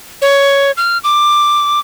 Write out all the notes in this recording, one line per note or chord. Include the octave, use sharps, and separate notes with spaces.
C#5
F6
D6